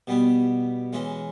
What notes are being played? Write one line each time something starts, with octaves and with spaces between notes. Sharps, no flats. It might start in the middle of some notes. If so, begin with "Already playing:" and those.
B2 G3 B3
E3 G#3 C#4